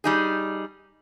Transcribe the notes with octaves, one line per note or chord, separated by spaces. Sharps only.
G3 D#4 G#4